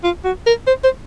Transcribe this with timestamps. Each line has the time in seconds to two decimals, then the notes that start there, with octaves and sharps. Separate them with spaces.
0.04 F4
0.25 F#4
0.46 A#4
0.67 C5
0.84 C5